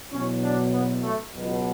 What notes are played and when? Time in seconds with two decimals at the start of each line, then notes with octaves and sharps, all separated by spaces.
0.11 E2 B2 F#3 C#4
0.42 D4
0.72 B3
1.02 A3
1.32 C#2 B2 F#3